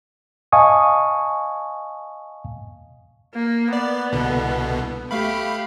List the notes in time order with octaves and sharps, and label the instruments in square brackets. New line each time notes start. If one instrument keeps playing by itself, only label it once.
[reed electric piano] D#5 F5 G#5 A5 C#6 D#6
[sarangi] A#3
[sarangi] B3 [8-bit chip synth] D5
[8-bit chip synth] C2 B2 D3
[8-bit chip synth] A3 F5 B5 [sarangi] G4